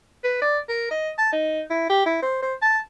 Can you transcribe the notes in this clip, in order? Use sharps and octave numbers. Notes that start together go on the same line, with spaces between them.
B4
D5
A#4
D#5
A5
D#4
E4
G4
E4
C5
C5
A5